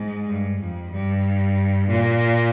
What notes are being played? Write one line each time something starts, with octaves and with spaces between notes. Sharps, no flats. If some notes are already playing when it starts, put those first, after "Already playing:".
Already playing: G#2
G2
F2
G2
A#2